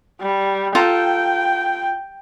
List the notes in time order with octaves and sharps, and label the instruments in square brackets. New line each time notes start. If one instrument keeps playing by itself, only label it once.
[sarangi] G3
[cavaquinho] F4 A4 A#5 [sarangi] G5